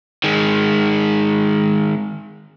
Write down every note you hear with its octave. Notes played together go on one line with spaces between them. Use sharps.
D#3 G#3